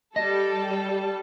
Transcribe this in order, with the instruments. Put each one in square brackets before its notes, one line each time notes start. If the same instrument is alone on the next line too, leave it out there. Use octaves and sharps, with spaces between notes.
[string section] G3 A4 [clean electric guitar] D#5